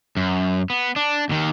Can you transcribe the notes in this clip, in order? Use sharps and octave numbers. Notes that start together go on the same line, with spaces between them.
F#2
B3
D4
D#2 D#3